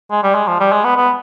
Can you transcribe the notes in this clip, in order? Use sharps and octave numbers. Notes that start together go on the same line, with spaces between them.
G#3
G3
G#3
F3
G3
G#3
B3
B3